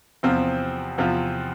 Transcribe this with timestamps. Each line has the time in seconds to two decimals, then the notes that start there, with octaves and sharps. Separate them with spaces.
0.23 E2 C3 F3 C4 F4
0.98 E2 C3 F3 C4 F4